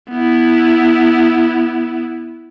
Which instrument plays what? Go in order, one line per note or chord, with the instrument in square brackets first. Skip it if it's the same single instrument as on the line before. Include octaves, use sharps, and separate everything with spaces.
[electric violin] B3 E4